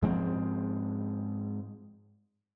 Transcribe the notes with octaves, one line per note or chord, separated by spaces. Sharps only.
G#2 F3 G#3 C4